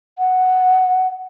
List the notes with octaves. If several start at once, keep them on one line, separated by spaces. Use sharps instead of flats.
F#5